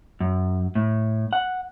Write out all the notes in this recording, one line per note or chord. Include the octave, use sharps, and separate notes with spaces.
F#2
A2
F#5